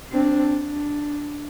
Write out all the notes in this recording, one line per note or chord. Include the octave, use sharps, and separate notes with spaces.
C4 D4
D4